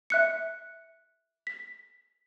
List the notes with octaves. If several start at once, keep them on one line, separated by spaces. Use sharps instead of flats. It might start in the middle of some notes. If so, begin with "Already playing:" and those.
E5 F#6 C#7
B6